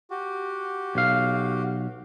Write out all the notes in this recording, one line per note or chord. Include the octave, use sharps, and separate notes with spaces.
F#4 G4
B1 F5